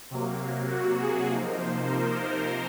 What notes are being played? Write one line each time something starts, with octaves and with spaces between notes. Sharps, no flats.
C3 F#3 A#3
F#4
G#4
C3 F3 A#3 D#4
C5
A#4